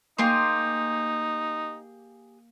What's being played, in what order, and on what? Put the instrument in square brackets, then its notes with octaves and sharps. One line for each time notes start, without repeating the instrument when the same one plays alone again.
[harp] A#3 D6 [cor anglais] D#4 [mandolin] G4 G#4 C6